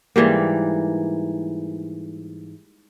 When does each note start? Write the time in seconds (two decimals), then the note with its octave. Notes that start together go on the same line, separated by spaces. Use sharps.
0.16 G#2 E3 G3 A#3